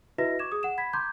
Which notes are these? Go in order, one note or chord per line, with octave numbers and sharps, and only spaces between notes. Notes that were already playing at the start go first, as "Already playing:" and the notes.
E4 F#4 B4 D#5 E5 A#6
C#6 D6 G#6 E7
G#4 D#6
F#5 E7
B5 G#6 B6
A#5 C6 D6 G6 G#6